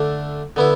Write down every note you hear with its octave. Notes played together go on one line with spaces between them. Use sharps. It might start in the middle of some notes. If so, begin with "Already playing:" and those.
Already playing: D3 A3 D4
D3 B3 E4